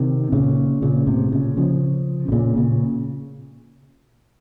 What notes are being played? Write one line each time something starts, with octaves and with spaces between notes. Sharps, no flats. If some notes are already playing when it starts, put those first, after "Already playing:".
Already playing: C3 D#3
A#2 C#3
A#2 C#3
A2 C3
A#2 C#3
C#3 F3
C3
A#2 C#3
A#2 C#3